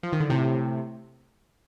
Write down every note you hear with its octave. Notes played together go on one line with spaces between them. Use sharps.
F3
D#3
D3
A2 C3